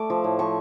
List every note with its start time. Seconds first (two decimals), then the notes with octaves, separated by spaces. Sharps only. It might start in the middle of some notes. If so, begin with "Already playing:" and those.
Already playing: A3 A5 D6
0.10 F3
0.24 A2
0.39 F3 C#6